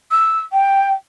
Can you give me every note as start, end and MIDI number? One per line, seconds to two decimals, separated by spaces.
0.11 0.40 88
0.52 0.91 79